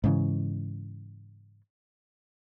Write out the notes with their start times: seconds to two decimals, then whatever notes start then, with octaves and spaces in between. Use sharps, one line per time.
0.04 G#2 C#3 E3